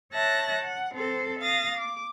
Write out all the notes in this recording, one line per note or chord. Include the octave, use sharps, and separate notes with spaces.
C#5 E5 A5 F#6 A#6
F#5
C4 A4 C5
F5 D#6 A6 A#6
D6